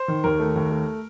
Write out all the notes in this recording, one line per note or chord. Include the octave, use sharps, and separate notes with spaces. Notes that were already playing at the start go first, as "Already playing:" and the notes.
Already playing: C5
D#3
D#2 A#4
A3
D#2
A3